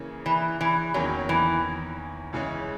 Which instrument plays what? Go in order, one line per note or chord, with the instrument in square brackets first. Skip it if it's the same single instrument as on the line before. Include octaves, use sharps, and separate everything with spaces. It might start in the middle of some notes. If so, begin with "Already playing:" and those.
Already playing: [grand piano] C#3 E3 A#3 C#4
[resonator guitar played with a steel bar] E3
E3
[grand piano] E2 D#3 A#3 C#4 [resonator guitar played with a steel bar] F#3
[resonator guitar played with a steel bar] E3
[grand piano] C#2 C#3 E3 G#3 C#4